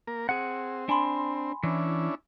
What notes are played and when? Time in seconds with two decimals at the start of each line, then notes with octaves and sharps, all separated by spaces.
0.07 A#3 A#4
0.29 C4 G#4 F#5
0.89 D4 G#5 B5 C6
1.63 E3 C#4 D4 E4